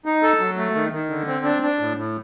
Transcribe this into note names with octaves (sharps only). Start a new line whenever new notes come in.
D#4
A4
F#3
A3
D#3
D#3
D3
C4
D4
D4
A2
A2